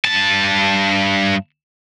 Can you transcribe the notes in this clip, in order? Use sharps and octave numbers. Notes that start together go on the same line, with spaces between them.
G2 A5